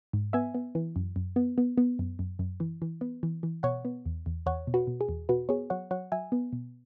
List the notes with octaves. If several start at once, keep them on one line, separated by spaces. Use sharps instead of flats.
G#2
B3 E5 G#5
B3
E3
F#2
F#2
B3
B3
B3
F#2
F#2
F#2
E3
E3
B3
E3
E3
B2 C#5 F#5
B3
E2
E2
E2 C#5 F#5
B2
F#4 B4
B2
G#4
E2
B2 F#4 B4
B3 G#4 C#5
F#3 C#5 F#5
F#3 C#5 F#5
F#3 E5 G#5
B3
B2